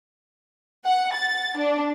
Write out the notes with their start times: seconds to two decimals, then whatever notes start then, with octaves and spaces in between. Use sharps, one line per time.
0.85 F#5
1.14 A6
1.57 D4